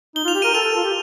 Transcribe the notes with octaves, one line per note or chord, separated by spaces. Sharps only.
D#4 G7
F4 F7
G4
A#4 D#7
A4 F7
F4
G4